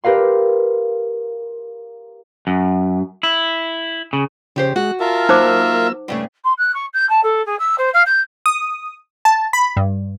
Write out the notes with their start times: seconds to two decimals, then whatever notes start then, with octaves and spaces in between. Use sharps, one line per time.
0.04 G4 A#4 B4 F5 C6
2.47 F#2
3.23 E4
4.13 C#3
4.56 F2 C#3 G4 C5
4.76 G#3 F#4 F#6
5.00 F4 A#4 E5 A5
5.29 F#3 A#3 D#4 C5 D6 E6
6.08 G2 C#3 A3
6.44 C6
6.58 F#6
6.74 C#6
6.93 G6
7.09 A5
7.23 A4
7.46 G#4
7.59 E6
7.78 C5
7.93 F5
8.06 G6
8.46 D#6
9.25 A5
9.53 B5
9.77 G2